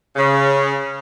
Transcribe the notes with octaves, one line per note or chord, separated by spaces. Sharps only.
C#3